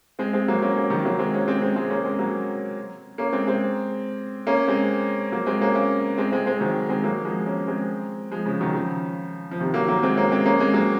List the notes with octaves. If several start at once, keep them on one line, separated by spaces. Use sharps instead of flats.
G#3 C4
G#3 C4
F#3 A#3
A#3 C#4
A#3 C#4
D#3 F#3
F#3 A#3
G#3 C4
A#3 C#4
G#3 C4
G#3 C4
G#3 C4
A#3 C#4
G#3 C4
F#3 A#3
A#3 C#4
G#3 C4
G#3 C4
A#3 C#4
G#3 C4
F#3 A#3
G#3 C4
A#3 C#4
A#3 C#4
G#3 C4
G#3 C4
G#3 C4
D#3 F#3
G#3 C4
F#3 A#3
F3 G#3
A#3 C#4
G#3 C4
F3 G#3
C#3 F3
D#3 F#3
C#3 F3
F3
C3 D#3
F#3 A#3
F#3 A#3
G#3 C4
A#3 C#4
G#3 C4
A#3 C#4
G#3 C4
F#3 A#3